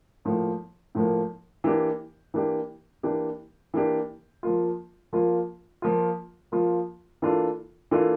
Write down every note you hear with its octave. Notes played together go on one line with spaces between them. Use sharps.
A2 F3 A#3
A2 F3 A#3
E3 A#3 D4 G4
E3 A#3 D4 G4
E3 A#3 D4 G4
E3 A#3 D4 G4
F3 A#3 F4
F3 A#3 F4
F3 A#3 F4
F3 A#3 F4
E3 A#3 D4 F4 A4
E3 A#3 D4 F4 A4